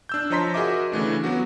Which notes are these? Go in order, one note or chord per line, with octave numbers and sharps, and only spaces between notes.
D4 E6 G6
F3 C#5 D#5 A#5 C6 B6
F#4 G#4 A#4 D#5 E5 D6
C#3 E3 A3 D4
F#3 B3 F#4